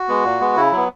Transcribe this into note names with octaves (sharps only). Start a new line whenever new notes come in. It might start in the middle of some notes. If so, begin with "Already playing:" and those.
Already playing: F#4
G#3 B3
A#2
G#3 B3
C#3 E4
F#3 B3